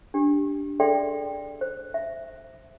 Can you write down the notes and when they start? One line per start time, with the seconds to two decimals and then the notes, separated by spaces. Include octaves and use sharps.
0.14 D4 G4
0.80 G#4 A4 D5 E5 G5 C6
1.61 C5
1.94 E5